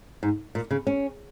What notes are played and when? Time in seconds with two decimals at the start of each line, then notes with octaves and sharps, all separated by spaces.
0.23 G#2
0.55 A#2
0.71 C#3
0.87 C#4